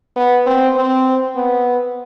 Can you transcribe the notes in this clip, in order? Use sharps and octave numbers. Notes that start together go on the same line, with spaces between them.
B3
C4
C4
B3